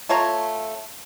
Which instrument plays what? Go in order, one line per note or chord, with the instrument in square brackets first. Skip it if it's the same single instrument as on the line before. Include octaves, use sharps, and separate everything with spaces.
[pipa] A3 F4 C#5 A#5